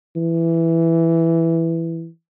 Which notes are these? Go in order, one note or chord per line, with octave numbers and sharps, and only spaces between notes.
E3